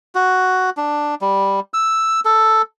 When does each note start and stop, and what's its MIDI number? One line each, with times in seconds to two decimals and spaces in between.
0.15 0.70 66
0.77 1.15 62
1.21 1.60 55
1.74 2.20 88
2.25 2.62 69